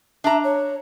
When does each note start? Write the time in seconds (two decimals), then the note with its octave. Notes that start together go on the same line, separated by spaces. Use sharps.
0.24 D4 E5 A#5
0.43 C#5